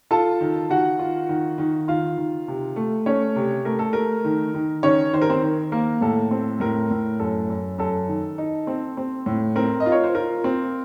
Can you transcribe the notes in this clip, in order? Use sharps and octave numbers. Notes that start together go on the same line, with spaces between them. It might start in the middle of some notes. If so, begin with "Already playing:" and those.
F4 A4 A5
D#3
D#3 F#4 F#5
F4
D#3
D#3
D#3 F4 F5
D#3
C3
A3
A3 C#4 C#5
C3
A3 A#4
A4
A3 A#4
D#3
D#3
D#3 C#4 C#5
D#3 C5
A#4
C4 C5
D#3
A#3 A#4
A2 A4
C4
A2 A#4
A2
F#2 A4
F#2
F#2 A4
D#3
D#4
C4
C4
A2
C4 A#4
D#5
F4
C#5
C5
F4 A#4
C4